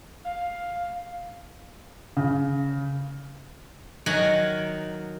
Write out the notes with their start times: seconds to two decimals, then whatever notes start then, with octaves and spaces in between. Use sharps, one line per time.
0.25 F5
2.17 C#3
4.06 D#3 F#3 A#4 F#5 G#5